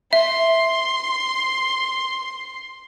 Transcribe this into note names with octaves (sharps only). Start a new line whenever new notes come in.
E5 C6